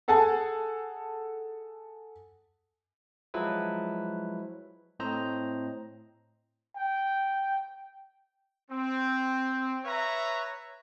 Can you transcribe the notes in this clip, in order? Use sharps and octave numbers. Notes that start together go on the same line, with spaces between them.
G#4 A4 F#5 G#5 A5
F3 F#3 G#3 E4 B4
A2 C4 C5 D#5 A#5
G5
C4
B4 C#5 E5 A#5